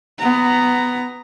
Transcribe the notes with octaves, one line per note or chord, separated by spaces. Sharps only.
B3 A#5